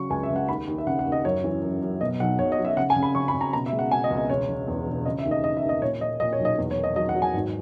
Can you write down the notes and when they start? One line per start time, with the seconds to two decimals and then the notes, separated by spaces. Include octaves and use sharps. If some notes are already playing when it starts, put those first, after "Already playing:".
Already playing: C#3 F#3 C#6
0.10 C#2 G#5
0.23 E5
0.30 C#2
0.36 F#5
0.49 D#2 B5
0.68 D#2
0.78 E5
0.87 C#3 F#5
0.99 F#5
1.06 D#2
1.12 D#5
1.24 F#2 C#5
1.44 E3
1.63 F#2
1.82 F#2
2.01 B2 D#5
2.20 B1 F#5
2.39 B1 C#5
2.52 D#5
2.58 F#3
2.65 E5
2.77 C#3 F#5
2.90 G#5
2.96 C#3
3.03 B5
3.15 C#3 C#6
3.28 B5
3.34 C#3
3.41 A#5
3.53 B2 A#5
3.66 E5
3.72 G#3
3.79 F#5
3.91 B2 G#5
4.04 D#5
4.10 C#2
4.17 D#5
4.29 E1 C#5
4.49 E1
4.68 E2
4.87 E1
5.05 C#3 D#5
5.19 E5
5.25 D#2
5.31 D#5
5.44 D#2 D#5
5.57 E5
5.63 D#2
5.69 D#5
5.82 A#2 C#5
6.01 A#2 D#5
6.20 A#2 D#5
6.33 C#5
6.39 B1
6.45 D#5
6.58 E2
6.71 C#5
6.77 D#3
6.84 D#5
6.96 F#3 D#5
7.09 F#5
7.15 F#3
7.22 G#5
7.34 G#1